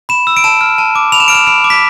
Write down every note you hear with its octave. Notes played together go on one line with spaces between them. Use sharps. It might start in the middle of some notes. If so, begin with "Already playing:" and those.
B5 E7
E6
D7
A5 E7
F6
A5
D6
B5 F7
E7
F6 D7
E7
B5 D7
D6
B6